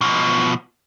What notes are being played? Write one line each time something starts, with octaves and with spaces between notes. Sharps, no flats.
B2 F3